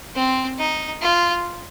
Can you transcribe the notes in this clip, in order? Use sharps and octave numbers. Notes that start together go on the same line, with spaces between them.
C4
D#4
F4